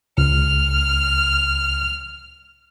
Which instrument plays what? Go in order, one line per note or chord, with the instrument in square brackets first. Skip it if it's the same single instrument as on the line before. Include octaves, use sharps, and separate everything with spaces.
[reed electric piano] C#2 [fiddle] F6